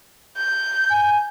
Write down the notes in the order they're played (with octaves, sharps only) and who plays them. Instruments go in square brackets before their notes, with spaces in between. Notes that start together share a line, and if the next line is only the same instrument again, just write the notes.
[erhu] G6
[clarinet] G#5